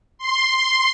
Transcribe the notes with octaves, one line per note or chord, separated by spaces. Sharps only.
C6